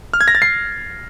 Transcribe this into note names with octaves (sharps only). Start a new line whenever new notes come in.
F6
G#6
A#6
A6
C7